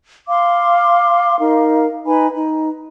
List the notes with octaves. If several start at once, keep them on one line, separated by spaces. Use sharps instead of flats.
F5 C6 D6
D#4 A#4 F5
D#4 B4 G#5 B5
D#4